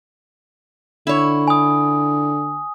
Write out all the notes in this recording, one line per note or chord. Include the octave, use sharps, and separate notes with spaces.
D3 E4 C#5
G#5 D#6